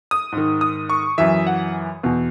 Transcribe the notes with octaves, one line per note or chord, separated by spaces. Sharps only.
D#6
G#2 D#3
D#6
C#6
F#2 E3 E5
F#5
E2 B2